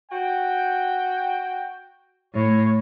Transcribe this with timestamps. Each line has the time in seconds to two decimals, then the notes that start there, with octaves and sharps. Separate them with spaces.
0.11 F#4 G5
2.35 A2 C#5